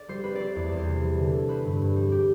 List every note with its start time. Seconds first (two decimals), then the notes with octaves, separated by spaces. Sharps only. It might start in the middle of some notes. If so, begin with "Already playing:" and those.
Already playing: D5
0.08 G3 C5
0.24 C4 B4
0.35 C4 C5 D5
0.56 E2 D5
0.67 E2 D5
0.77 C5
0.87 C3
1.02 E3
1.18 D3
1.34 A3
1.49 C4 B4
1.65 G2
1.81 G2
1.96 G3
2.12 G4